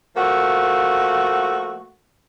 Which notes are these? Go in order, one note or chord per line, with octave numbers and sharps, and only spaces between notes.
F3 A3 A#3 F#4